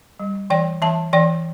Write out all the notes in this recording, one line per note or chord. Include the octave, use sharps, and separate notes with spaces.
G3
E3 D5 G5
E3 E5 A5
E3 D5 G5